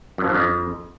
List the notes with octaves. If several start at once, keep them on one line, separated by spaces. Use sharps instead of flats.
F#2
F3
G2
F2